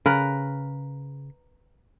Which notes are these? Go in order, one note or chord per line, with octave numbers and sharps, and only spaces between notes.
C#3 A#4 B4